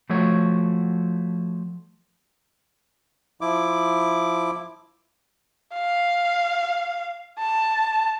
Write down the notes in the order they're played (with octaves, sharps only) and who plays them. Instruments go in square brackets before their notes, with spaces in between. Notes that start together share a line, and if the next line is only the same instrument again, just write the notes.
[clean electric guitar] F3 A3 F#4 C#5
[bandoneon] F3 E4 D6
[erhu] F5
A5